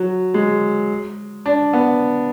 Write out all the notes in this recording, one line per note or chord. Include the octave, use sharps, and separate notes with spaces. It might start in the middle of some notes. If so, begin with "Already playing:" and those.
Already playing: F#3
G#3
D4
B3